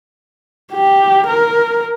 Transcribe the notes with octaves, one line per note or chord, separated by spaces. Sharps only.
G4
A#4